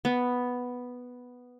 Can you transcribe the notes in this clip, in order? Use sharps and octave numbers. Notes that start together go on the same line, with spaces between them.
B3